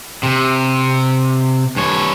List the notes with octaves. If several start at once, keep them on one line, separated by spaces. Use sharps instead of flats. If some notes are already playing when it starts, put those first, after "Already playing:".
C3
G2 C#5